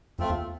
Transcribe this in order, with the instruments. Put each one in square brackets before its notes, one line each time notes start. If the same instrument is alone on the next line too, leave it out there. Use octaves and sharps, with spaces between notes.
[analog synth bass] F2 [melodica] A3 C4 F4
[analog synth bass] E2